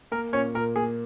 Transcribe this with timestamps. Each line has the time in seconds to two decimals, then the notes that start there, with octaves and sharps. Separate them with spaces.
0.11 A#3 A#4
0.33 A#2 C#4 C#5
0.55 A#2 A#4
0.76 A#3 G#4